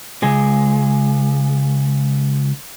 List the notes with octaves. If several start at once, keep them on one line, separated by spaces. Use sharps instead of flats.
C#2 G#3